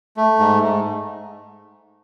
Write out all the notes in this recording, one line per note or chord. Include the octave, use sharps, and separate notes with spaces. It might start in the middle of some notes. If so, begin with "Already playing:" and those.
A3
G#2
G#2